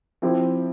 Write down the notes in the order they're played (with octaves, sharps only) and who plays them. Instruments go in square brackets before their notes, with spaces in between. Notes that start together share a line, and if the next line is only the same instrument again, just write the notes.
[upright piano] F3 C4 E4 G4 C5